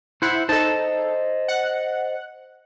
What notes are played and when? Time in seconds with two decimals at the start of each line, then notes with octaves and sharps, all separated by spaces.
0.22 E4 C5 F#5
0.49 D#4 A4 C5 D#5 A5
1.48 F#5